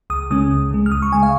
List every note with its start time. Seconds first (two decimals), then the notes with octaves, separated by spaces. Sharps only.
0.10 C#2 D#6
0.31 C#3 G#3 C#4 D#6
0.52 C#2
0.71 C#3 G#3
0.86 F6
0.92 C#2 D#6
1.02 C#6
1.12 C#3 G#3 G#5
1.23 F5